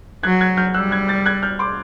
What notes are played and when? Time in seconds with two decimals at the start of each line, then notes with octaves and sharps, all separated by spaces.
0.23 F#3 F#6 G#6
0.41 F#6 G#6
0.57 F6 G6
0.74 G3 E6 F#6
0.91 F#6 G#6
1.08 G6 A6
1.26 F#6 G#6
1.42 F6 G6
1.59 C6 D6